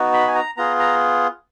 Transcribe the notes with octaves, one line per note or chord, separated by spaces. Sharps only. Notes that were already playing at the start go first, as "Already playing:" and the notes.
Already playing: B3 D#4 F#4
B5
G#5
A#5
B3 F4 G#4 A#5
A#5